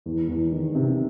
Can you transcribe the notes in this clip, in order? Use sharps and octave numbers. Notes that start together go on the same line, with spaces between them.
E2
E2
D#3
C3